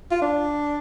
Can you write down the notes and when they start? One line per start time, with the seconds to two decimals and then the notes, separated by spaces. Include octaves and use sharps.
0.11 F4
0.22 D4